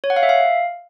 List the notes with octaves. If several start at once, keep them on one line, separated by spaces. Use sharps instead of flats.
C#5
F#5
F5
E5
F5